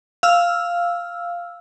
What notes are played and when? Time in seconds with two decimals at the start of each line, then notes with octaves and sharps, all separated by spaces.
0.23 F5 E6 F6